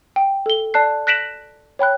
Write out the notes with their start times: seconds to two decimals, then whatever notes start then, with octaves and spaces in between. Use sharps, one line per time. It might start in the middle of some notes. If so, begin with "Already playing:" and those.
0.16 G5
0.46 A4 G7
0.74 D5 A5 F#6 C7
1.07 F#6 A#6 B6 D7 E7 F#7
1.79 C#5 G5 B5 F#6